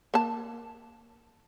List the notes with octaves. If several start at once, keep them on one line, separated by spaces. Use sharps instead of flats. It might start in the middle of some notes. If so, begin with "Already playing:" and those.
A#3 A5